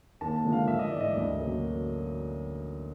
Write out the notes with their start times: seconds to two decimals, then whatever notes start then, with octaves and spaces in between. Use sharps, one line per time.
0.21 D#2 A5
0.44 D3 F3 G#3
0.52 F5
0.68 A1 E5
0.79 D#5
0.90 G#2 E3 D5
1.00 D#5
1.15 D2
1.38 D3 F#3 A#3 C#4